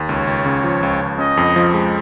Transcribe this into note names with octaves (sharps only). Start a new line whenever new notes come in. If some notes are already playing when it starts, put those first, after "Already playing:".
Already playing: D#2
C#2 C#5
C#2
C#3
F3
C#2
C#2
C#4 D#5
F2
F3
G#3